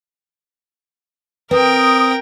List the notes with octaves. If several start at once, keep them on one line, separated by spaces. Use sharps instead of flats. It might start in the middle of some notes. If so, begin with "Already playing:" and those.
C4 A#4 B4 G5 D#6